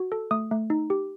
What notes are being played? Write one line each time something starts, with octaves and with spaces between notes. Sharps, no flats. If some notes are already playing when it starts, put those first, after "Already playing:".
Already playing: F#4
A4
A3 D#6
A3
D#4
G4